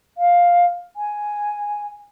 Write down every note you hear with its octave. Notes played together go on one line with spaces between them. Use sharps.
F5
G#5